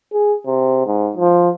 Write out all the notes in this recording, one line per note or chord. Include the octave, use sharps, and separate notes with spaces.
G#4
C3
G#2
F3